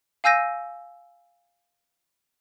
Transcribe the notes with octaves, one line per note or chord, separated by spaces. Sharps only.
F5 G#5 E6 G6 A#6 D#7